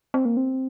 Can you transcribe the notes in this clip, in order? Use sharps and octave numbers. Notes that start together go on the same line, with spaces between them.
C4
A#3
C4